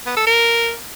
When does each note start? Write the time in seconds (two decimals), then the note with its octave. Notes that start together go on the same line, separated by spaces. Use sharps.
0.06 B3
0.16 A4
0.27 A#4